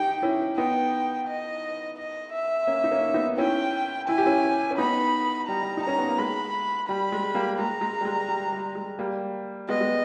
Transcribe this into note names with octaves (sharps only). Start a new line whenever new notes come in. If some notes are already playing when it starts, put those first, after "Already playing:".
Already playing: D#4 G4 G5
C#4 E4
B3 D#4 G5
D#5
D#5
E5
A#3 C#4
D#4
A#3 C#4
B3 D#4
C#4 E4 G5
E4 G#5
G4
C#4 E4
C#4
B3 D#4 B5
G3 A#5
G3
D#4
C#4 A#5
B3
A#3
G#3 B5
G3 B5
G#3
G3 A#3
G#3 A#5
G#3
G3
G#3
G3
G3
G#3
G3 A#3
G#3 B3 D#5
G#3